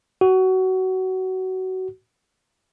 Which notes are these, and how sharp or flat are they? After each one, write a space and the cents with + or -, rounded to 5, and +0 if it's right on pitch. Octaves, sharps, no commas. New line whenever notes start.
F#4 +20